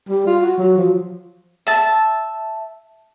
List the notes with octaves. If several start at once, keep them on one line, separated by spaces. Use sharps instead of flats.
G3
F4
F#4
F#3
F3
E5 A5